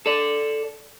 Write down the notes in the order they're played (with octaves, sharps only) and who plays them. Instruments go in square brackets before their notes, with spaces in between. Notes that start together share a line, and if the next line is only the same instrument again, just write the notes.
[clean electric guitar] A4 D5